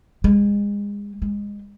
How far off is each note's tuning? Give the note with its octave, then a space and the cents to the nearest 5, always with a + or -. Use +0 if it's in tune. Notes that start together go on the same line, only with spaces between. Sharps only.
G#3 -30
G#3 -25